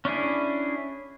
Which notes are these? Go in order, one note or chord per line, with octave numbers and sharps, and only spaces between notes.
C#4 D4 E4 G#4